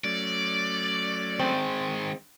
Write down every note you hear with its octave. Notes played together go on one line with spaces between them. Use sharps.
F#3 A3 C#4 D5
D#3 G#3 C4